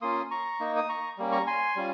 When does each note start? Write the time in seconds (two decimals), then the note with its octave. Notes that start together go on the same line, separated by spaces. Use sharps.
0.01 A#3 C#4 F4 C6 D#6
0.31 A#5 C#6
0.60 A#3 D#4
0.76 D#6
0.89 A#5 C#6
1.18 G3 A#3 C#4
1.32 A#5 C#6
1.47 G#5 C6
1.76 G3 C#4 F4